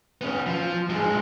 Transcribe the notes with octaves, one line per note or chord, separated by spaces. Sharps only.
B3 C#4
F3
G2 G#3